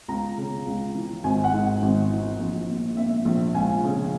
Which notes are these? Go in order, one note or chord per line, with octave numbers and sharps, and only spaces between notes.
C#2 A#5
C#3
C#2
E3
G#1 G#5
F#5
G#2
G#1
E3
A#1
A#2
A#2 E5
A#1
C#2 G#5
C#3